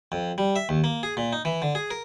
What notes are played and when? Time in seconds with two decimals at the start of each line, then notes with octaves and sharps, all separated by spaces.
0.12 F2
0.38 G3
0.56 E5
0.69 D#2
0.84 A#3
1.03 G#4
1.17 A#2
1.33 D#4
1.45 E3
1.62 D3
1.75 G#4
1.91 A#4